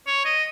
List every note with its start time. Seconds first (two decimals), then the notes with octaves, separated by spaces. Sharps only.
0.07 C#5
0.25 D#5